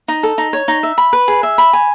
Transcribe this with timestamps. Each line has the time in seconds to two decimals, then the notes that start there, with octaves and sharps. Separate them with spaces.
0.08 D#4
0.23 A4
0.38 D#4
0.53 C#5
0.68 D#4
0.83 E5
0.98 B5
1.13 B4
1.28 G#4
1.43 E5
1.58 B5
1.73 G#5